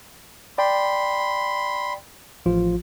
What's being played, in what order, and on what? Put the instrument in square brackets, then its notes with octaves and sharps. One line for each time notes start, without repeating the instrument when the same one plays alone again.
[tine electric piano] D5 G5 [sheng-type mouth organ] B5 C6
[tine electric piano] A1 F3 F4